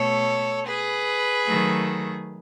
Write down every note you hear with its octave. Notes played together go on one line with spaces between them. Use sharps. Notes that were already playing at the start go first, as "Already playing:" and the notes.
Already playing: B2 A3 A4 C#5
G#4 B4
D#3 F#3 A3